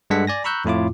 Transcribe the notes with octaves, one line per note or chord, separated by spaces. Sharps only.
G2 G#3 D4 A4 F#5 B6
D5 G#5 A#6
A#5 B5 C#6 E6 F#6 G6
F2 A2 E4 F4 D6